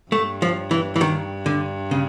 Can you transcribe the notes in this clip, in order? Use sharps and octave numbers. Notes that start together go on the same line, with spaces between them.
G2 A3
F3
E3
E3
D#3
D3
C#3